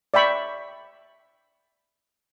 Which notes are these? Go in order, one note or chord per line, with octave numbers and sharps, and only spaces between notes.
D5 E5 G5 B5 C#6